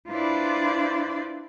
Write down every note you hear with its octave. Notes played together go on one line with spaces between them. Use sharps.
D4 E4 F4 B4 C5 D5